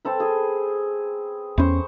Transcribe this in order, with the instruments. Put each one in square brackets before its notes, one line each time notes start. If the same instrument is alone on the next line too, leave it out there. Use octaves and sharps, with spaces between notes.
[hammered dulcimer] C4 A4 B4
G#4
[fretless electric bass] E2 C#4 [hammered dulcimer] C5 B5 C#6